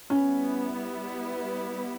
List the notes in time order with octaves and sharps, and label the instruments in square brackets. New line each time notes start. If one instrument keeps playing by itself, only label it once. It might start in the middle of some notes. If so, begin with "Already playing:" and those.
[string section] G3 B3 E4 [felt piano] C#4